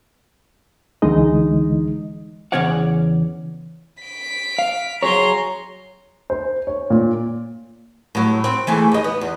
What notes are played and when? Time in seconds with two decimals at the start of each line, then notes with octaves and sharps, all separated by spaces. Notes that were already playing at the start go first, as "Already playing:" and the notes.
1.02 C#2 D3 E3 G#3 D#4 D#5
2.52 E2 C#3 C#4 C#5 D5 F#5
4.03 B6 D7
4.58 F5
5.03 F#3 G#4 C#5 A#5 C6
6.30 C5
6.67 C#5
6.90 A#2
8.15 A2 F#3
8.44 C4
8.67 E3 A3 G#4
8.92 D#2 D#5
9.04 B3
9.21 E2